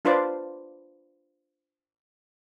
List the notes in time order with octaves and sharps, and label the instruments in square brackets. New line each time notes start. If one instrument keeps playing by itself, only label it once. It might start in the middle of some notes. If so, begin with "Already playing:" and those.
[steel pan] D4 F4 B4 C5 D5